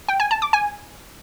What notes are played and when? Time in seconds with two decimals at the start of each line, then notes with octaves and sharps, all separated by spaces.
0.08 G5
0.20 G#5
0.31 A5
0.42 D6
0.53 G#5